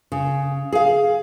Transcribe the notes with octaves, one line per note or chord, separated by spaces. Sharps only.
C#3
G#4 F5